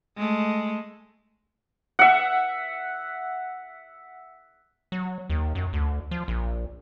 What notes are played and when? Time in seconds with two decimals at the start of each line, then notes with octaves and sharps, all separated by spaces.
0.17 G#3 A3
1.99 E5 F#5
4.92 F#3
5.30 D#2
5.55 F#2
5.73 D2
6.11 F3
6.28 A#1